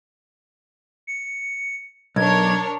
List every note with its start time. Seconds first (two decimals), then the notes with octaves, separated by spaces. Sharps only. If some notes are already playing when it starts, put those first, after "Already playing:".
1.07 C#7
2.16 B1 D4 A#4 C#5 G#6